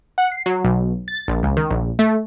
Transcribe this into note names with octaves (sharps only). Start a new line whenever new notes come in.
F#5
C7
F#3
B1
A6
A#1
C#2
D#3
A#1
A3